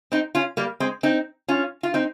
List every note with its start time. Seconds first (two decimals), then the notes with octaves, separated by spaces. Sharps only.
0.12 C4 D#4
0.35 C#4 F4
0.57 G3 A#3
0.80 G#3 C4
1.03 C4 D#4
1.48 C#4 F4
1.83 F4
1.94 C4 D#4